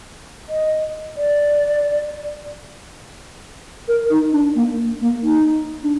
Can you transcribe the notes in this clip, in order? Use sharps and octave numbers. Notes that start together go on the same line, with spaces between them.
D#5
D5
A#4
D#4
D4
A#3
A#3
D#4
D4